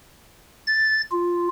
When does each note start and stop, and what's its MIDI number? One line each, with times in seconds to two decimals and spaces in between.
0.67 1.01 93
1.11 1.48 65